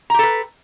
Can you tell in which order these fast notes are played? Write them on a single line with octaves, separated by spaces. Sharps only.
A#5 G4 A4 B4